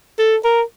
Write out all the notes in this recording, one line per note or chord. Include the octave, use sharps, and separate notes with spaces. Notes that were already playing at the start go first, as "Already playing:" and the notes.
A4
A#4